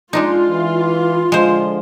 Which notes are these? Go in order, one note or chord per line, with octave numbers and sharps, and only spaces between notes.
G#3 D4 D#4 F4 C6
E3
D3 F3 G#3 C5